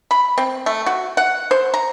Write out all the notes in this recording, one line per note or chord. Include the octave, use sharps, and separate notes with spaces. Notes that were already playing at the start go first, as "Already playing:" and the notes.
B5
C4
A3
F#4
F#5
C5
A#5